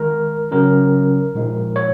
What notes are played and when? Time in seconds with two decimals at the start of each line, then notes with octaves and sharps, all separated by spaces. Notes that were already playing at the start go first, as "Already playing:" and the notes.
Already playing: D#3 G#3 D#4 A#4
0.51 C#3 F#3 C#4 A#4
1.35 A#2 F3 G#3 D#4
1.76 C#5